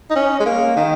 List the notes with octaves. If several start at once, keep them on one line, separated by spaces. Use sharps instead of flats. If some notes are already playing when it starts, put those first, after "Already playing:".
D#4
C#4
G#3
A#3
D#3